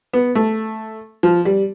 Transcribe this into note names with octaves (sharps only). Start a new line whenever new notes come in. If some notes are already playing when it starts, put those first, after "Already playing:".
B3
A3
F3
G3